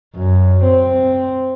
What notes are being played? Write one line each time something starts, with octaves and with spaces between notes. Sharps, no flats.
F#2
C4